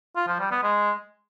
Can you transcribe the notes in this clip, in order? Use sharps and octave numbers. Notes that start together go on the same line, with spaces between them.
F4
F3
G3
B3
G#3